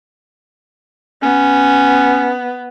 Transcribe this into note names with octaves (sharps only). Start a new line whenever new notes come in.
B3 C#4